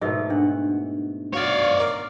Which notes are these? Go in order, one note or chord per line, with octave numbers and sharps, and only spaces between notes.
G#2 B2 A3 A#4 D#5 E5
D4 F#5
F#4 C#5 D5 F5
A#4